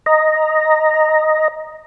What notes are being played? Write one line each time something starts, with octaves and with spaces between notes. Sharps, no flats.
D#5 A#5